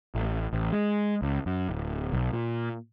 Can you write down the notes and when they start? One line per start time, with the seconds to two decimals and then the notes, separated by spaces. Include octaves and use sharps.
0.15 A1
0.53 A1
0.72 G#3
1.22 C#2
1.46 F#2
1.69 D1
2.13 B1
2.33 A#2